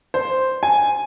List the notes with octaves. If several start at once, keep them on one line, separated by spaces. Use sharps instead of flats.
C5
G#5